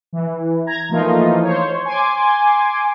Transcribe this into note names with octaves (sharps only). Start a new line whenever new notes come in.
E3
A#5 G#6
E3 F3 A3 A#3 D#4 F4
C5 C#5
G#5 C6 D6